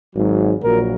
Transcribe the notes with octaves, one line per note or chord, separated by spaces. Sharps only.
G#1 G#2 F#3
A#1 A#2 F#3 A#4